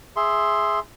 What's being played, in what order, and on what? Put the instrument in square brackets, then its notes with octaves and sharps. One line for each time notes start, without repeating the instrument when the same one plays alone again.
[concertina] G#4 E5 C6